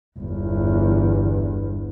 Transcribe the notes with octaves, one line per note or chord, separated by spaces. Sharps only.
G1 E2